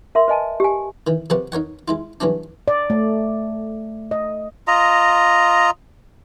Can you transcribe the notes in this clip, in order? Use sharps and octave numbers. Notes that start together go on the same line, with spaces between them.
A#4 E5 C6
B4 D#5 G#5 A5
G4 G#5
D#3 E3
C3 F3 F#4 A#4 B4 F#5
D#4 A#4 C#5 F#5
G#3 E4 F4
G2 E3 F#3 C#4 D4
D5
A3
D#5
F4 D#5 A#5